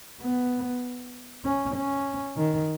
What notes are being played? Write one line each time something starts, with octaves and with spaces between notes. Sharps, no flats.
B3
C#4
C#4
D#3